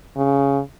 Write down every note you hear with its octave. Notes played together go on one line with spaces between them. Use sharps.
C#3